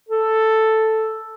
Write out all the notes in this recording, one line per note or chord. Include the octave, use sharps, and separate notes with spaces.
A4